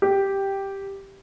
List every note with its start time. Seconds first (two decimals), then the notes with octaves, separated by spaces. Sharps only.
0.02 G4